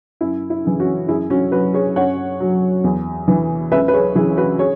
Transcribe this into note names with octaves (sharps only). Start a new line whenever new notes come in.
F#2 E4
E4
C#3 E3
C#4 F#4
F#2 E4 G#4
C#4 F#4
F#3 F#4 B4
G#4 C#5
F#2 C#5 F#5
F#3
E2
E3
C#2 B4 E5
B4
G#4 C#5
C#3 E3 E4 G#4
F#4 B4
G#4 C#5